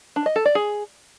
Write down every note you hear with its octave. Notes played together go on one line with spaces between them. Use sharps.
D4
D#5
A4
D5
G#4